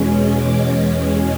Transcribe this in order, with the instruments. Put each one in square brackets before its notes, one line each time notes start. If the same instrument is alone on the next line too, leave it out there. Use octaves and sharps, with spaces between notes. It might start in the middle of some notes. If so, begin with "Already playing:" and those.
Already playing: [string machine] E2 B2 G#3 C#4
D6